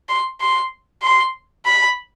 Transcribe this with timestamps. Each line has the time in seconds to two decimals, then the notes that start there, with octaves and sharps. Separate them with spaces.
0.09 C6
0.41 C6
1.03 C6
1.66 B5